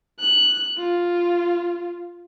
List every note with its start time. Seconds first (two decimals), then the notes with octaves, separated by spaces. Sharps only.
0.20 F#6
0.77 F4